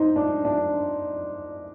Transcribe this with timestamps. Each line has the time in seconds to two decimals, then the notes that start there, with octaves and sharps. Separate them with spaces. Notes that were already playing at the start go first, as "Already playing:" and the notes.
Already playing: D#4 C5
0.16 D4
0.45 D4